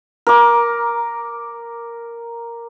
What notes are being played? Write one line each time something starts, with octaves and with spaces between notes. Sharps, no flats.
A#4 D6